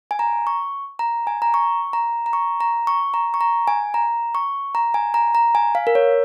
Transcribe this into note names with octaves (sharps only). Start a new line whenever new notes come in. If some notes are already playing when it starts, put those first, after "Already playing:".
G#5
A#5
C#6
A#5
G#5
A#5
C#6
A#5
A#5
C#6
A#5
C#6
A#5
C#6
A#5
G#5
A#5
C#6
A#5
G#5
A#5
A#5
G#5
F5
A#4
C#5